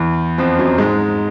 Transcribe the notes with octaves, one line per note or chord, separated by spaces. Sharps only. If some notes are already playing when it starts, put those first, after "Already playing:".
Already playing: E2 E3
F2 F3
F#2 F#3
G#2 G#3